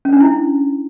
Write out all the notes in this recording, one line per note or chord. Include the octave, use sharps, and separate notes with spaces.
C#4
D4
E4